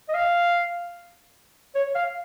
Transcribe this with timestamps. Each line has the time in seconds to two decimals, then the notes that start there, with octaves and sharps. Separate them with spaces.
0.09 D#5
0.14 F5
1.75 C#5
1.95 F5